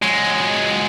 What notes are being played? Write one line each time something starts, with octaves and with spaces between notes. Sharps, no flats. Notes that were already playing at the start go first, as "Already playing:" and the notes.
F#3 G#3